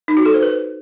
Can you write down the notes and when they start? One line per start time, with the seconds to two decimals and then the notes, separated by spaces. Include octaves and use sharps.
0.08 D#4
0.17 F#4
0.25 A4
0.34 C5
0.43 B4